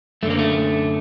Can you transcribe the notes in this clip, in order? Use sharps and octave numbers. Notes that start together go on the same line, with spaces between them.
F#2 D3 A3 A#3
A3